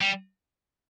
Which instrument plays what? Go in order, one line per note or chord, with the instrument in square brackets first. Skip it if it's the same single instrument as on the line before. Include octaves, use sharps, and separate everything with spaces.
[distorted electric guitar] G3